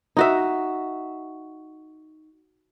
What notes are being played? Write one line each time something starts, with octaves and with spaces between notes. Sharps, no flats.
D#4 F#4 E5